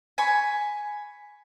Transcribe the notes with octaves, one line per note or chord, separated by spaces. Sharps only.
G#5 B5 C#6